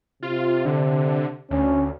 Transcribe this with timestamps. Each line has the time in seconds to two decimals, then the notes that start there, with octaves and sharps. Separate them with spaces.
0.23 C3 F4
0.66 D3
1.51 D2 C#4